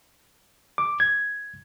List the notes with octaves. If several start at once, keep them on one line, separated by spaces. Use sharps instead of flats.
D6
G#6